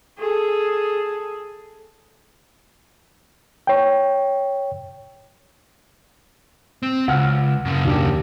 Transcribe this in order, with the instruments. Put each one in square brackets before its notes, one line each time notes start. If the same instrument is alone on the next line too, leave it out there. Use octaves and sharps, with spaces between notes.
[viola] G#4 A4
[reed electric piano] C#5 G5
[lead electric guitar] C4
[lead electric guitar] C#2 [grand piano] F#5 F6
[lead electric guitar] F#2 C#3
[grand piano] D#2 D4 G4